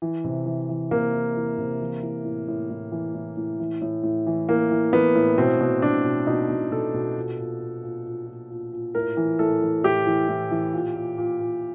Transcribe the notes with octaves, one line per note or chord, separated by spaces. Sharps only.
E3
C3
E3
E3
C3 A#3
E3
E3
C3
E3
E3
A2
A2
A2
E3
A2
A2
E3
A2
A2
E3
E3 A#3
E3
E3 B3
A2
B2 C4
B2
B2 D4
B2
B2 D#4
B2
B2 A4
B2
A#2
A#2
A#2
A#2
A#2
A#2
A#2
A#2
A2 A#4
E3
A2 A4
E3
A2 G4
E3
A2
E3
A#2
A#2
A#2
A#2